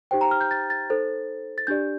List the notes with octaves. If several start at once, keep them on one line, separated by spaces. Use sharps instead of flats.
D#4 G4 C5 G5
A#5
F6
G6
A6
A6
D#4 A4 C5
A6
D4 G4 D5 G6